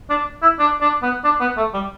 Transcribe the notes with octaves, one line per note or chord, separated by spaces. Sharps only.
D4
E4
D4
D4
B3
D4
B3
A3
G3